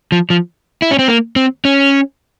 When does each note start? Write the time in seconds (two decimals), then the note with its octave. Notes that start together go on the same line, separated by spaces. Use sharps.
0.12 F3
0.30 F3
0.82 E4
0.91 C#4
0.99 C4
1.08 A#3
1.36 C4
1.65 C#4